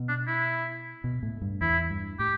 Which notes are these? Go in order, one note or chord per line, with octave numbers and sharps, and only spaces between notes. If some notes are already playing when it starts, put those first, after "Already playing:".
Already playing: B2
D4
E4
B2
A2
G2
E2 E4
G2
A2 G4